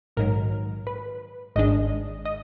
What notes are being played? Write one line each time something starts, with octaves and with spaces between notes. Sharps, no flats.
A#1 G#2 D#3 F#3 A#4
B4
G#1 G#2 D#3 G#3 D4 D#5
D#5